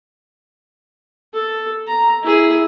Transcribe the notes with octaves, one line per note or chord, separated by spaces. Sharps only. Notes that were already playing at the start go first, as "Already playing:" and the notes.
A4
A#5
E4 G#4